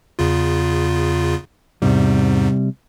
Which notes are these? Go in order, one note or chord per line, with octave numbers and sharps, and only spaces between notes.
E2 C#3 F4
E2 G#2 C3 G3